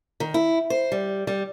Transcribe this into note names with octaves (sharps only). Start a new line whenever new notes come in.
D#3
E4
C5
G3
G3